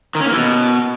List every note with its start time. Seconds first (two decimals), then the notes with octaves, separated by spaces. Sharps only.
0.15 D#3
0.20 C#4
0.26 A#3
0.31 E3
0.37 B2